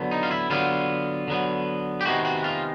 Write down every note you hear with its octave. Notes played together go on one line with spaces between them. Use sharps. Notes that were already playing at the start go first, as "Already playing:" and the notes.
Already playing: D3 F#3 B3
D#4
F4
E4
D3 F#3 B3 F4
D3 F#3 B3
G4
C3 D#3 G#3 B3 F#4
F#4
F4